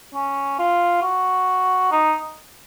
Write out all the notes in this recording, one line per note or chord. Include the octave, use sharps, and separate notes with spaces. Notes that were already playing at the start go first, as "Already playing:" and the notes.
C#4
F4
F#4
D#4